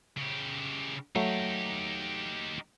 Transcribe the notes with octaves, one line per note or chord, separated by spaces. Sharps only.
C#3 G4
F#3 A3 D#4 G4